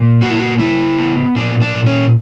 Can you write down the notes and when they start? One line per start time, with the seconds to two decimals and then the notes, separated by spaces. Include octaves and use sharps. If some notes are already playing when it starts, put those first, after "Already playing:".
Already playing: A#2
0.21 A#3 F#4
0.29 E4
0.39 F#4
0.59 C#3 E4
0.98 B3
1.35 A#2 D4
1.62 D4
1.74 A#2
1.86 C#4